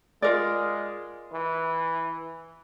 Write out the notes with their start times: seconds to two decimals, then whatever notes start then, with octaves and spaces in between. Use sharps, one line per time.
0.22 G#3 F4 A#4 D5
1.33 E3